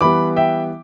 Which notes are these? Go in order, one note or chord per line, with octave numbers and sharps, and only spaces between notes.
E3 G3 B3 B5 D6
E5 G5